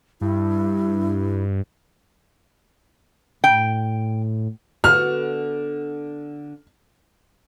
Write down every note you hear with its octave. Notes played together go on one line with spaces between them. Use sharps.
G2 E4
A2 G5
D3 B3 F#4 F6